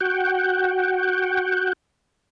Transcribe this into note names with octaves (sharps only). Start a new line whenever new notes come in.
F#4 F#5 G5